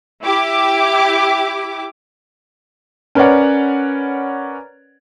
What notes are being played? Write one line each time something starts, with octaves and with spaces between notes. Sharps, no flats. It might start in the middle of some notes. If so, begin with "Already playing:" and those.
E4 G4 D6
C#4 A#4 B4 C#5 D5 F#5